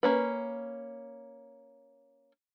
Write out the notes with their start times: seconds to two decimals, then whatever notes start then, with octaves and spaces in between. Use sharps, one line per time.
0.03 A#3 C#4 B4